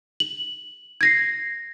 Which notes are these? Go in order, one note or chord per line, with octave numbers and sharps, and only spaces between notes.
F#7
G#6 A#6 C7